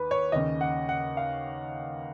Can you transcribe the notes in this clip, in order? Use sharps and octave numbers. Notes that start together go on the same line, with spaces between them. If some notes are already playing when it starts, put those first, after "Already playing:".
Already playing: D#2 B4
C#5
D#2 C#3 D#5
F#5
F#5
F5